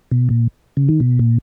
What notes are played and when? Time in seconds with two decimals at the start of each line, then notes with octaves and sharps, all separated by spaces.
0.11 B2
0.29 A#2
0.77 C#3
0.89 D#3
1.00 B2
1.19 A#2